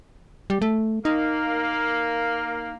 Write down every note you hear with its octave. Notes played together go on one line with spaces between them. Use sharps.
G3
A3
A#3 D#4